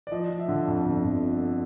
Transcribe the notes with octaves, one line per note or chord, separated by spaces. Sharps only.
D5
F3 D#5
F3
E5
D3
F2
G1
F2